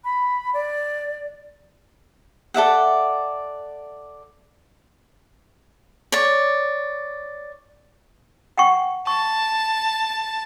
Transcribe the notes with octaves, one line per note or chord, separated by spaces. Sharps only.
B5
D5
A4 D5 E5 F#5
C#5 D5
F#5 G5 C#6
A5 C#6